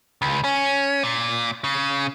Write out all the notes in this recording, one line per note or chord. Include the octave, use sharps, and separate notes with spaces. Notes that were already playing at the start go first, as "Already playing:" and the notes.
C#2
C#4
A#2
C#3